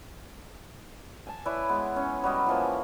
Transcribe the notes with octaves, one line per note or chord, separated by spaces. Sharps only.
G#5 A5
E4 B4 C#5 D5
G#3 B3
C#4
F#3 G3 F#4 D#5
E3 F3 A#3